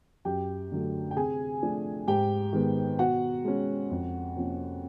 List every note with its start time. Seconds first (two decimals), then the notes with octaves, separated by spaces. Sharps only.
0.25 F#2 G4 G5
0.71 D3 F#3 A3
1.11 G5
1.16 C3 G#4 G#5
1.63 F3 A3 D4
2.07 G#2 G4 G5
2.53 D#3 G#3 B3
2.98 B2 F#4 F#5
3.45 G#3 C#4
3.90 F2
4.36 C3 F3 A#3 C#4